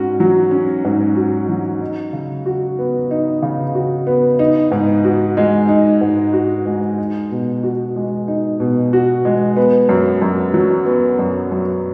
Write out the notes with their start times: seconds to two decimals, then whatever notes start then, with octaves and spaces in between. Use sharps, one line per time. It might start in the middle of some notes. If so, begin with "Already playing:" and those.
Already playing: G#2 C#4 F#4
0.20 F#3
0.51 C#4
0.85 G#2
1.16 F#4
1.49 F#3
1.80 D#4
2.13 C#3
2.46 F#4
2.79 B3
3.11 D#4
3.42 C#3
3.75 F#4
4.07 B3
4.39 D#4
4.71 G#2
5.04 F#4
5.37 G#3
5.68 D#4
6.01 G#2
6.33 F#4
6.66 G#3
6.98 D#4
7.31 B2
7.63 F#4
7.96 G#3
8.28 D#4
8.60 B2
8.93 F#4
9.25 G#3
9.57 B3
9.89 F#2
10.22 F#2
10.54 F#3
10.86 B3
11.19 F#2
11.52 F#2